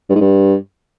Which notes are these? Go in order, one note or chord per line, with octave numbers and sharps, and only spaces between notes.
G2
G#2
G2